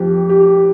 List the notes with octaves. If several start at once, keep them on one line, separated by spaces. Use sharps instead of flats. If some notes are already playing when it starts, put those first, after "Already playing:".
Already playing: F2 F3 G4
G4